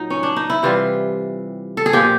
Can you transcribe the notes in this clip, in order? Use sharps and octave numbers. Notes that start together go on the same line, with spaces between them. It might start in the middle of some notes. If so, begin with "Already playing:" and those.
Already playing: A#2 F#3 D#4
C#4
D4
D#4
E4
C3 E3 G3 F4
A4
G#4
A#2 F3 G4